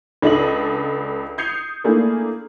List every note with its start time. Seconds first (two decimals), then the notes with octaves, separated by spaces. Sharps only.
0.22 C#2 D4 A4 D#5 D#6 F#7
1.38 D#6 G6 G#6 C7 C#7 F7
1.84 A3 A#3 D4 E4 G#4